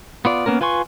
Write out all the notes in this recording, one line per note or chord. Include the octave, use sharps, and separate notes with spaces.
B3 F4 D5
A#3 B3 C#4 A#4
F4 B4 G#5 C6 C#6